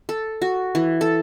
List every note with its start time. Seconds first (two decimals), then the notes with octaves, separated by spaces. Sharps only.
0.09 A4
0.42 F#4
0.75 E3
1.01 A4